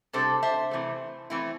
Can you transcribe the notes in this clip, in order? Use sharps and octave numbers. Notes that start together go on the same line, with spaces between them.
C3 G3 D4 A4 C5
C5 E5
C3 E3 A3
E3 A3 C4 E4